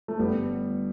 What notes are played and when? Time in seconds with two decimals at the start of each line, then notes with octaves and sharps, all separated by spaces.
0.08 A3
0.19 G1 G3 B3